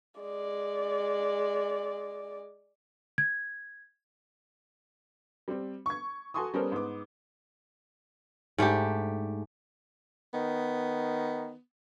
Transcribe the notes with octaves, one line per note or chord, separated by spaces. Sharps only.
G#3 D5
G#6
G3 C4
C#6 G#6
F#4 A4 G#5 C6 C#6 D#6
G3 B3 C#4 A4 A#4 C5
G#2 B3 D6
G#2 A3 D4 G4
D#3 B3